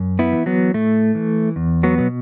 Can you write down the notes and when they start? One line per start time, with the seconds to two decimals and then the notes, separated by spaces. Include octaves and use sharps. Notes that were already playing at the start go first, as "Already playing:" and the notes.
Already playing: F#2
0.19 B3 E4
0.33 E3
0.46 F#3 B3
0.74 A2 A3
1.15 E3
1.56 E2
1.83 F#3 B3
1.98 B2 F#3